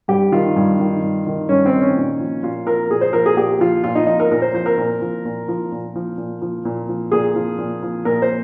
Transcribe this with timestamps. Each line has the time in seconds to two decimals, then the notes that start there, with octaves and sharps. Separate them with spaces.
0.08 G2 G4
0.32 D#3 F4
0.56 G2
0.79 D#3
1.02 G2
1.27 D#3
1.49 G2 C#4
1.66 C4
1.72 D#3
1.81 C#4
1.96 A#2
2.20 F3
2.43 A#2 F4
2.67 F3 A#4
2.90 A#2 G#4
3.01 C5
3.13 F3 A#4
3.26 G#4
3.37 A#2 G4
3.60 F3 F4
3.84 A#2 F4
3.95 D#4
4.07 F3 D#4
4.20 A#4
4.31 A#2 A#4
4.42 C5
4.54 F3 C5
4.66 A#4
4.78 A#2
5.02 F3
5.25 A#2
5.48 F3
5.72 A#2
5.95 F3
6.18 A#2
6.42 F3
6.65 A#2
6.89 F3
7.12 A#2 G#4
7.36 F3
7.58 A#2
7.83 F3
8.05 A#2 A#4
8.22 C5